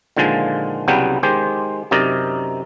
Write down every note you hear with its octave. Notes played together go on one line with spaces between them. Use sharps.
A#2 D3 D#3 F3 G#3
C2 C#3 F#3 G3 B3 G5
D#3 G#3 G4 C5
F#2 C3 D#4 A#4 D5 D#5